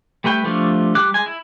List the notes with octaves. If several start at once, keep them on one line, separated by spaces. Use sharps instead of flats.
G3 A3 B4 G5
F3 G3 A3 D4 F4
G3 D6 F#6
G#3 G#5
E4